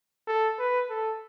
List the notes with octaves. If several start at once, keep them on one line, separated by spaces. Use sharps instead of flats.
A4
B4
A4